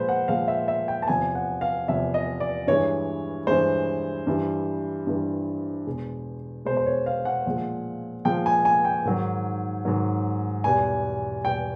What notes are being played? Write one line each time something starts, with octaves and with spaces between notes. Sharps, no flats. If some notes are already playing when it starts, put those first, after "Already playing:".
Already playing: A#2 F3 G#3 B4 C5
F#5
A#2 F3 G#3 F5
E5
E5
G5
A5
E2 C3 F3 G#5
F#5
F5
E2 C3 F3 E5
D#5
D5
G2 E3 G#3 C#5
G2 E3 G#3 C5
G2 E3 G3
G2 E3 G3
E2 B2 G#3
E2 B2 G#3 C5
C5
C#5
F5
F#5
A#2 F3 G#3
A#2 F3 G#3 G5
G#5
G#5
G5
G#2 D#3 F#3
G#2 D#3 F#3
E2 B2 G3 G#5
E2 B2 G3 G5